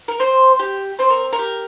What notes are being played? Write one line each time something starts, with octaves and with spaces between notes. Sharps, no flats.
A#4
C4 C5
G4
C4 C5
A#4
A#4
G4